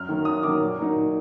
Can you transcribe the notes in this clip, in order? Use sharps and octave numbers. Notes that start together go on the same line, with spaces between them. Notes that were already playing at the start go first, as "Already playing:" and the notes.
Already playing: F#2 F6
D#3 F#3 A#3
F#2 D#6
D#3 F#3 A#3 D6
A#2
F#3 A#3 D#4
A#2